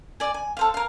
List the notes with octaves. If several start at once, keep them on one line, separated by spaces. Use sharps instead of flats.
D5 G#5
G#5
A4 C5 F5
A#4 F5